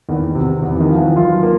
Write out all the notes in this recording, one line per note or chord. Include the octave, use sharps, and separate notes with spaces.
E2 D#3
C3
E2
E3
D#3
F3
E3
F#3 F4
A#3